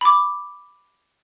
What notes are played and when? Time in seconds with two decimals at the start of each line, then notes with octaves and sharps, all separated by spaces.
0.01 B5 D6